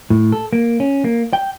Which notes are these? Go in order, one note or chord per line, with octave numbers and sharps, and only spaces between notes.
A2
A4
A#3
C#4
A#3
G5